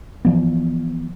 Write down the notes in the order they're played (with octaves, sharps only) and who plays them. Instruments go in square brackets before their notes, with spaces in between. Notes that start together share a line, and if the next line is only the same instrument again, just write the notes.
[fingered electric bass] E3 F3 B3